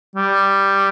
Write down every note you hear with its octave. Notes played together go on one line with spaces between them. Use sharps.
G3